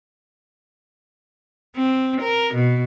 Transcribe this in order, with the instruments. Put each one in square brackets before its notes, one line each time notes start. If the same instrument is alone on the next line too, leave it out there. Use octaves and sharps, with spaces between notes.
[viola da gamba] C4
A#4
B2